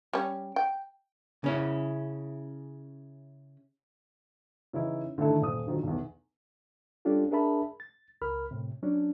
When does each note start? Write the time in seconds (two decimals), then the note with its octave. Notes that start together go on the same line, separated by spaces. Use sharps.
0.13 G3 C#4
0.56 G5
1.44 C#3 C#4 E4
4.73 C#3 E3 C#4 D#4 E4
5.18 D3 D#3 A3 E4 A4
5.41 D#1 D#6
5.67 D3 D#3 F3 F#3
5.83 B1 E2
7.05 G3 C#4 D4 F4 G4 A4
7.31 D4 G#4 A#4 E5 A5 B5
7.80 A6
8.22 C#2 A#4 B5 F6
8.51 A2 C3
8.83 F#3 C#4 D4